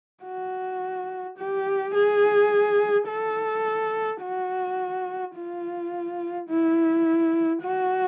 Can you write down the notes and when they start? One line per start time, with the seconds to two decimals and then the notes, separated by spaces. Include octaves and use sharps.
0.24 F#4
1.37 G4
1.94 G#4
3.08 A4
4.22 F#4
5.36 F4
6.49 E4
7.63 F#4